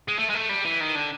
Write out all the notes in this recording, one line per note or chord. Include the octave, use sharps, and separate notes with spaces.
G#3
A3
G#3
A3
G3
E3
D#3
D3